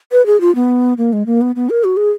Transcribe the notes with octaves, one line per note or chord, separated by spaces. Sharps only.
B4
G#4
F4
B3
A#3
G#3
A#3
B3
B3
A#4
F#4
G#4